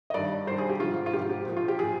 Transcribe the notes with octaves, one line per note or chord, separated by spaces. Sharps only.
D#5
G2 D#3 D5
G2 D#3 C5
G#4
G4
G#2 F3 F4
F4
G#2 F3 G4
G4
A#2 F3
F4
G4
A#2 F3 G#4